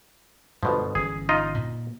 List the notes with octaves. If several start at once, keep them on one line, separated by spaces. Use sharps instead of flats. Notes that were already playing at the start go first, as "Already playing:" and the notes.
G1 G2 B2 F3 G#3
G1 E3 C#4 G#4
D#4 F4 D#5
A#2